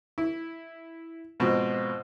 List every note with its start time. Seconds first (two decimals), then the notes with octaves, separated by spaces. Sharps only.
0.18 E4
1.40 G#2 B2 F3 C4